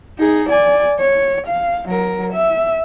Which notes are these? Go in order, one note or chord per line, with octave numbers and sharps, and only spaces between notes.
D#4 G#4
D5 G#5
C#5
F5
F#3 A#4
E5